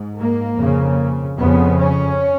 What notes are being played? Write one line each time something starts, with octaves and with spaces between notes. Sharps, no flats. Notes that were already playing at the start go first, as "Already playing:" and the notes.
Already playing: G#2
A#3
F2 C#3
F2 C#3 B3
C#4